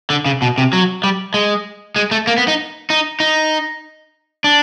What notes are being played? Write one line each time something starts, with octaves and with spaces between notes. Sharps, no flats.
D3
C#3
B2
C3
F#3
G3
G#3
G#3
A3
A#3
B3
D#4
D#4
D#4
D4